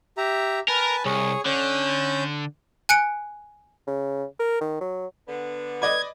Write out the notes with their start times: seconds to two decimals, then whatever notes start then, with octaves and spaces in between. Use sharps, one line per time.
0.18 G4 E5 A#5
0.68 A#4 B4 G#5 A5
1.05 C2 G#4 C#5
1.45 D3 C#4 G6
2.89 G#5 F#6 C#7 D7
3.87 C#3
4.39 A#4
4.61 D#3
4.81 F#3
5.28 D3 B3
5.82 B4 D5 D#5 G#6